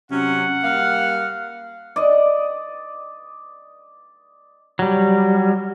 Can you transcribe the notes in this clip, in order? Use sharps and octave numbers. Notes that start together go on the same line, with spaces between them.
C3 F#3 C#4 F#5
G3 A#3 F5
D5 D#5
F#3 G3